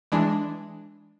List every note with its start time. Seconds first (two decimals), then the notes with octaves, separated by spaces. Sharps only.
0.12 E3 G#3 D4